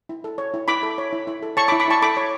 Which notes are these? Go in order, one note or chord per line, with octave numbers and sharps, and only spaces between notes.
E4
A4
C#5
E4
E4 B5 D6
A4
C#5
E4
E4
A4
C#5 A5 C#6
B5 D6
E4
B5 D6
E4 A5 C#6
A4 B5 D6
C#5